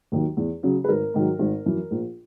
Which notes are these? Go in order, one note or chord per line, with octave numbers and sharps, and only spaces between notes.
D#2 D#3 F#3
E2
C#3 F#3
B4
G#1 A#4
G#2 D#3 F#3
G#1
F#2 E3
A#1